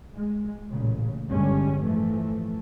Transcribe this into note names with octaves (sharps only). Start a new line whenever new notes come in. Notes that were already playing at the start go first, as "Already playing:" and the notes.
G#3
A1 A#2 C#3
G1 D3 G3 G#3 C#4
A2 E3 F3 A3